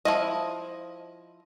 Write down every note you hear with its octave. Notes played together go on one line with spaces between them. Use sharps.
F3 E4 D#5